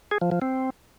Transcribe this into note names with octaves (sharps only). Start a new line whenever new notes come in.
G#4
F3
F3
C4